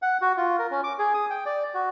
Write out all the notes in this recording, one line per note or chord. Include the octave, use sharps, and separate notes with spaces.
F#5
F#4
F4
A#4
C#4
D6
G#4
D#6
G5
D5
F#4